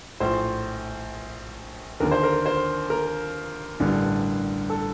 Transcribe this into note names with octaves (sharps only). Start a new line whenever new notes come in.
A#1 A2 C5
D#2 D3 A#4
C5
A#4
C5
A#4
A1 G2 D3
A4